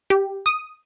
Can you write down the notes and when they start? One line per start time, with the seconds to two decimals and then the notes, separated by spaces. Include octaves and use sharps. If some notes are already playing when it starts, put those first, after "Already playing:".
0.10 G4
0.46 D#6